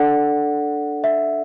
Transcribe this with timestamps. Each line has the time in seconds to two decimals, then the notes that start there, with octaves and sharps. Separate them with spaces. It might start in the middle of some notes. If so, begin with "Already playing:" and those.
Already playing: D4 A4 D5 F#5
1.04 E5